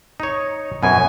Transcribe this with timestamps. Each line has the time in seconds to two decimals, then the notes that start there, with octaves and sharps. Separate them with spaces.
0.20 D#4 C#5
0.83 F#2 B2 G#5